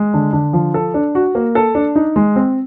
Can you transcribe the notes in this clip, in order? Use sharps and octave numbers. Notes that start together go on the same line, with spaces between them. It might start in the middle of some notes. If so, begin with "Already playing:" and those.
Already playing: G#3
D3
D3
F3
A4
D4
F#4
A#3
A4
D4
D#4
G#3
C4